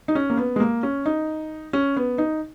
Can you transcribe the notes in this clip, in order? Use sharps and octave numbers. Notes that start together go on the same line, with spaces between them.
D#4
C#4
A#3
B3
G#3
A#3
C#4
D#4
C#4
B3
D#4